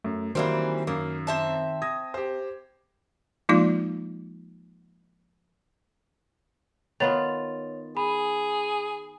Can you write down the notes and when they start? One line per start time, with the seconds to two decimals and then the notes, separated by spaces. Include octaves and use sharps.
0.04 F#2 A3
0.35 D#3 E3 F#3 G3 A#3 C4
0.87 F#2 A#3
1.27 C4 E5 A5
1.82 D#6 G#6 A#6
2.14 G4 C5
3.49 F3 G#3 A#3 D#4 F4 D5
7.00 D#3 B3 F4 C#5 A6 F7
7.97 G#4 B5